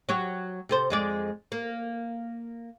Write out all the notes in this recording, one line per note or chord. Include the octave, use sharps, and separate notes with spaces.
F#3 G4 C#5
C3 A4 C5
F2 G#3 D5
A#3